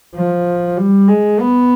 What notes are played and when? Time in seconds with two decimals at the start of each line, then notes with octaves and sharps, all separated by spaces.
0.15 F3
0.77 G3
1.08 G#3
1.40 B3